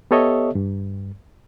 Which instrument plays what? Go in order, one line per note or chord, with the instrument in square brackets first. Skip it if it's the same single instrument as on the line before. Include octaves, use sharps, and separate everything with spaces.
[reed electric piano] B3 G4 A4 C#5 D#5 E5
G2